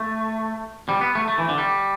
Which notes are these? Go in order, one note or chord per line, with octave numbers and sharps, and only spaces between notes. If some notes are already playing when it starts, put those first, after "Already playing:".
Already playing: A3
G3
B3
A3
A3
E3
D3
G3